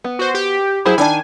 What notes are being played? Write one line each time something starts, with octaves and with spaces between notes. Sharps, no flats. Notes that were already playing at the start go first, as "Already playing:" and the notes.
B3
F#4 C5
G4
F#3 E4 G#4 C5
D#3 D4 G#5 A5